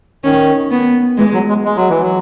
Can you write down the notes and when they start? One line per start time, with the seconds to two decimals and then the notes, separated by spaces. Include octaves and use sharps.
0.24 D#3 C#4
0.71 B3
1.18 E3 G#3
1.33 F#3
1.49 G#3
1.65 G#3
1.77 F#3
1.90 E3
2.02 F#3